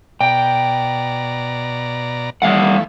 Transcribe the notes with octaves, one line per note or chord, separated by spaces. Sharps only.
B2 D5 G5 A#5
E3 G3 A3 F5 F#5